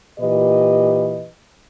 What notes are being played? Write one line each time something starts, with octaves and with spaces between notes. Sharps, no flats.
A#2 E3 G4 B4 D#5